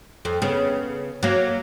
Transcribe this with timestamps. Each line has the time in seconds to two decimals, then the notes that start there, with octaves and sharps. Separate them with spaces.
0.25 F2
0.42 C#3 B3
1.23 F#3 A#3